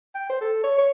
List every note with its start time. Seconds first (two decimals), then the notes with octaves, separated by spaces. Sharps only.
0.15 G5
0.30 C5
0.41 A4
0.64 C#5
0.78 C#5